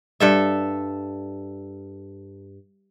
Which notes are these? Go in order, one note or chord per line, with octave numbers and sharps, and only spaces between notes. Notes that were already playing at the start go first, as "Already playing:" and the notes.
G2 A4 E5